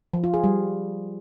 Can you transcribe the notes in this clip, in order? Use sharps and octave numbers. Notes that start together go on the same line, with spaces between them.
F3
F4
G#4
G3